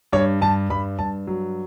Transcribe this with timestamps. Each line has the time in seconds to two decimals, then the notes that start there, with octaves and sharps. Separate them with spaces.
0.13 G2 C#5
0.41 G2 A5
0.70 G2 B5
0.99 G2 A5
1.27 F#3